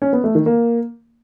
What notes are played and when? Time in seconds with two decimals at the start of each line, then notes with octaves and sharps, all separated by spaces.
0.02 C#4
0.13 B3
0.24 A3
0.35 D#3
0.46 A#3